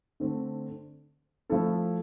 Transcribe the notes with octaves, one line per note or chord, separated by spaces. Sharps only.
D3 A3 C4
F3 A3 E4 A4